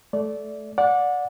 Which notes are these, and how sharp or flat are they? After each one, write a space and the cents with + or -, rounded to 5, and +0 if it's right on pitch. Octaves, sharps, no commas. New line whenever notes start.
A3 -15 D5 -15
D5 -10 F#5 -30